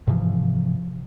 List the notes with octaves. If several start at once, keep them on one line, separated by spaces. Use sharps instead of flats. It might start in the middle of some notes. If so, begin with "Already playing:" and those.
G#2 C3 E3 F3